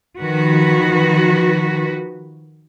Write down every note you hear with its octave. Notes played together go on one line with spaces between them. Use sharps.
D#3 F3 F#4 B4